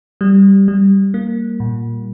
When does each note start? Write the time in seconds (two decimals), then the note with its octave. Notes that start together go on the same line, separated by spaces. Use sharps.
0.21 G3
0.68 G3
1.14 A#3
1.60 A#2